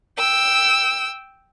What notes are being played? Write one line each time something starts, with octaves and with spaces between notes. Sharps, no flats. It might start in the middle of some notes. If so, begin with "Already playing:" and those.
G5 E6